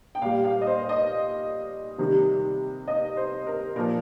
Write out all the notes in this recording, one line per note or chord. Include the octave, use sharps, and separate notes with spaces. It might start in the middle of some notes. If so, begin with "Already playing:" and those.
G5
A#2 G3 F5
F5
D#5
C5
D#5
C3 D#3 G3
D#5
C5
A#4
A#2 F3 A#4